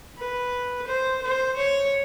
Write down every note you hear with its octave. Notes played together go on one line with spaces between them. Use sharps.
B4
C5
C5
C#5